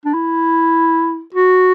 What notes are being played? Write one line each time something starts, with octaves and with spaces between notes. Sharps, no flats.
D4
E4
F#4